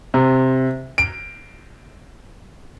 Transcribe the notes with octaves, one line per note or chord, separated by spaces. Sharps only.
C3
D7